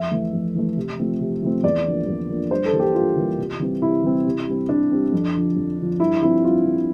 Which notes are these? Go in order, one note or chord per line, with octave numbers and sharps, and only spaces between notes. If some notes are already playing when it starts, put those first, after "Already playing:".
Already playing: F2 E5
E3 A3
F2
E3 A3
C3
F3 A3 C4
C3
F3 A3 C4
E2 D5
D3 F3 A#3
E2
D3 F3 A#3
G2 C5
A4
E3 G3 A#3
G4
G2 F4
E3 G3 A#3
C3
E3 G3 C4
C3 E4
E3 G3 C4
C3
G3 C4
C3 D4
G3 C4
F2
D3 F3
F2
D3 F3
G2 E4
F3 C4 E4
G2 F4
F3 C4